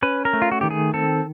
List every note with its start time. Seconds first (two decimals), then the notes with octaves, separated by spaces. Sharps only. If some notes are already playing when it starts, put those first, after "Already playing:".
0.03 C#4 B4
0.25 A#4
0.33 A3
0.42 F4
0.52 F#4
0.61 D#3 G4
0.71 G#4
0.94 C4 A4